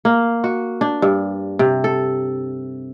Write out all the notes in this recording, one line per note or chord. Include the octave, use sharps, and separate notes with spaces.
A#3
F#4
D4
G2
C3
A4